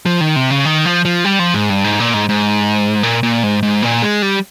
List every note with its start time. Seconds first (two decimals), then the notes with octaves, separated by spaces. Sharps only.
0.06 F3
0.21 D#3
0.36 C3
0.50 C#3
0.65 D#3
0.85 F3
1.05 F3
1.25 G3
1.39 F3
1.54 G#2
1.69 G2
1.84 G#2
2.00 A#2
2.14 G#2
2.29 G#2
3.03 A#2
3.23 A#2
3.43 G#2
3.63 G#2
3.82 A#2
4.02 G#3
4.22 G3